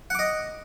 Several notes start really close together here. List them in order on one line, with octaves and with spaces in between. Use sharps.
F#5 D6 D#5